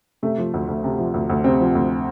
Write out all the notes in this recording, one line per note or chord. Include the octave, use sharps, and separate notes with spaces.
C3 A3
F3
D2
D2
C3
F3
D2
D2
C3 C4
F3
D2